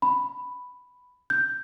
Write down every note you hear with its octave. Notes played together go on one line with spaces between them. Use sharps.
B5
G6